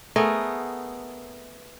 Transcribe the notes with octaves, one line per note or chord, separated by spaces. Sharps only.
A3 B3 G#4 A#4